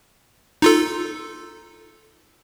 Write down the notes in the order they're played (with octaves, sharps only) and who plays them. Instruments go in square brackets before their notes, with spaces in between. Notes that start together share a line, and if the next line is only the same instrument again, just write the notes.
[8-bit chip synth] D#4 F4 A4